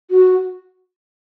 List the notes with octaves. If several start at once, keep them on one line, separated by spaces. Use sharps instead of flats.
F#4